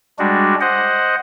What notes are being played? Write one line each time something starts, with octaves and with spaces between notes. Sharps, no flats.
G3 G#3 D4 F#4
C5 D#5 F#5